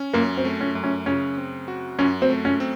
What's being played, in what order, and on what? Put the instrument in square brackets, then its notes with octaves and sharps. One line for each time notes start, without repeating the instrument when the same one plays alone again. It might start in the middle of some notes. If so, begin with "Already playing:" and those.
Already playing: [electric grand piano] C#4
[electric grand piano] F#2 [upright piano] A#3
[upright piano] C4
[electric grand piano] A3
[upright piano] C#4
[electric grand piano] F#2
[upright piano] C#4
[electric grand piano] C#3 [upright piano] C#4
[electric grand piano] C4
F#4
[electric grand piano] F#2 [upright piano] C#4
[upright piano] C4
[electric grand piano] A3
[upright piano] C#4
[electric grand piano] C4